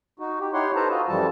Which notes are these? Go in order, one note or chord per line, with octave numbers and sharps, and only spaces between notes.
D#4 F#4
G4
D#4 E4 G4 C#5 F#5 C6
A4 B4 C5 A5 A#5
F4 F#4 D#5
F#2 E3 F3 G3 A4 A5